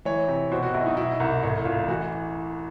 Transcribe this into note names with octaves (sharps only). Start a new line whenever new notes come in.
E3 C#5
C3
B2 C5
F#4
B1 E4
D#4
B2 E4
C2
A1 E4
A1 F4
E3 F#4